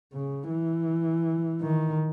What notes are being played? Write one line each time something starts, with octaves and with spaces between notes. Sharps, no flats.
C#3
E3
D#3